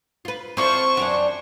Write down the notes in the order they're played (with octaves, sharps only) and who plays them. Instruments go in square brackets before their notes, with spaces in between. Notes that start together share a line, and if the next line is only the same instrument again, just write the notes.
[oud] F4 B4
[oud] C4 D5 [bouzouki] E4 F4 A4 [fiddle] C5 C#6
[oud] F#2 [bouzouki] E3 C4 D4